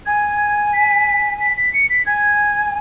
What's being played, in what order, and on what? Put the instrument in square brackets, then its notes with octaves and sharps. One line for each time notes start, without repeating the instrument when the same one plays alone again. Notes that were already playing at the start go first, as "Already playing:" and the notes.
[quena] G#5 [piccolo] G#6
[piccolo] B6
B6
B6
C#7
B6
[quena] G#5 [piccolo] G#6